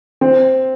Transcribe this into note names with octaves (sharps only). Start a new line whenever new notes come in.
C4